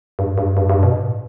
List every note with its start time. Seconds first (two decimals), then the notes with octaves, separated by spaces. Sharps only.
0.19 G2
0.38 G2
0.57 G2
0.70 G2
0.83 B2
0.95 A2